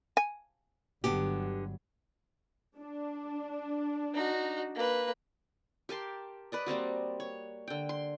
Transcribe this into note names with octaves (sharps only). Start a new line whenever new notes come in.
G#5
G1 D3 F#3 B3 G4
D4
D#4 F#4
A#3 B4
G4 A#4 A5 C6
B4 D5 D#5
G3 A#3 C4 F#4
C#5
D3 G5
C6